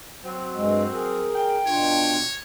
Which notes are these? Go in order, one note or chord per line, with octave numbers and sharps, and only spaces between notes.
F#3 C4
G2 G#3
G#4 A#4
G5
B2 D4 F4 C#5